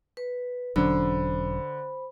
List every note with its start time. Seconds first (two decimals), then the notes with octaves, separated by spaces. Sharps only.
0.17 B4
0.76 E1 D3 F#3 C#4 C5 B5